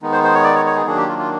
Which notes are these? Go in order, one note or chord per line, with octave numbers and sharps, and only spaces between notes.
D#3 G#3 B3 D#4
C5
C5
C#5
D5
C#5
C#5
G#4
D#3 F#3 A#3 D4 G#4
G4
F4
F4